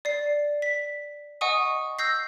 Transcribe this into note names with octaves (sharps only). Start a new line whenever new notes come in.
D5 C7
B6
D#5 F#5 G#5 C#6 D#6
E6 G6 A#6 C7